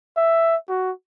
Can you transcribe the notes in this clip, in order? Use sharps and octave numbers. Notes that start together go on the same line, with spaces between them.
E5
F#4